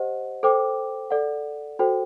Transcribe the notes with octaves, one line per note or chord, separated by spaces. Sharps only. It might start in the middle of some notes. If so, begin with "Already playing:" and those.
Already playing: G4 C5 D#5 F#5
A4 C5 G5 D6
A4 D5 F#5
F#4 A4 C5 G5